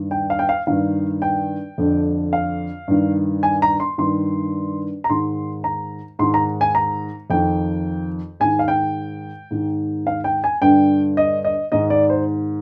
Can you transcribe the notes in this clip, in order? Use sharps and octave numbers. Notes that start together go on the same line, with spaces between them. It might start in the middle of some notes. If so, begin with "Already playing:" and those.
Already playing: G2 D#3
G5
F5
G5
F5
G2 D#3 F5
G5
F2 D3
F5
G2 D#3
G#5
A#5
C6
G2 D#3 C6
A#5
G#2 D#3 C6
A#5
G#2 D#3 C6
A#5
G#5
A#5
F2 D#3 G5
G#2 D#3 G#5
F5
G5
G#2 D#3
F5
G5
G#5
G2 D3 G5
D#5
D#5
G#2 D#3 D#5
D5
C5